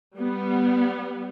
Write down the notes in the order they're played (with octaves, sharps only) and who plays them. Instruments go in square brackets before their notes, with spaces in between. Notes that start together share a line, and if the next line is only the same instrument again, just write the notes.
[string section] G3 B3